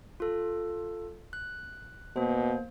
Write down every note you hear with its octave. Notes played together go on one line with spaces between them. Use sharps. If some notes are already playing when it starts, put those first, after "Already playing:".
F4 A4
F#6
B2 A#3 C5